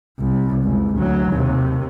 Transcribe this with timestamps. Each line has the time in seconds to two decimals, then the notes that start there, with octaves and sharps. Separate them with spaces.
0.19 C2
0.62 F#1 C#2
0.95 D2 F#3
1.29 D#2 C3